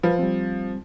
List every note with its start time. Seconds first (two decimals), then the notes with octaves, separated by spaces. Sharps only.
0.03 F3 B4
0.19 G3 C4